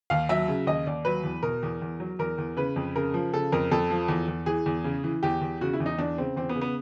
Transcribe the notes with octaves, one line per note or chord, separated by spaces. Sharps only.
D#2 F5
F#3 E5
C#3
D#2 D#5
D#2 D5
F#3 B4
E2
B2 A#4
E2
E2
F#3
E2 A#4
E2
C#3 B4
F2
C#3 A#4
F3
C#3 A4
F2 A#4
F2 A4
F3
E2
E2
E3 G#4
E2
C#3
E3
E2 G4
E2
C#3 F#4
E4
E2
D#4
E2 D4
C#3 C4
E2 C4
B3
C#3
B3